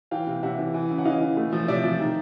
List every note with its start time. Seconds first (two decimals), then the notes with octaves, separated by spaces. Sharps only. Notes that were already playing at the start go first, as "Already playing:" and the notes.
0.11 E3 F5 G5
0.27 C3
0.43 C3 E5 F#5
0.58 E3
0.74 E3
0.90 C#3
0.98 F#5
1.05 E3 D#5 F5
1.21 E3
1.37 A3
1.53 F3
1.68 C3 D5 E5
1.84 F3
2.00 D#3